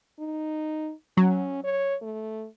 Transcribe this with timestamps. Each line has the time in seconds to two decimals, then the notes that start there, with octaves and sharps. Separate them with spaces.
0.19 D#4
1.17 F#3 C#4
1.64 C#5
2.02 A3